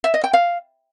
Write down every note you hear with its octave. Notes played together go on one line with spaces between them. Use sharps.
E5
D#5
G5
F5